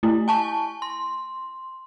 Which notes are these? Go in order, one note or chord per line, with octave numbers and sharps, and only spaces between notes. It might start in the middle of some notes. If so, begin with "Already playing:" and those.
A3 E4
G#5 A5 C#6
C6